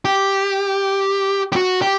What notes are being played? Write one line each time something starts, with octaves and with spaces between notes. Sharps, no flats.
G4
G4
F#4
G4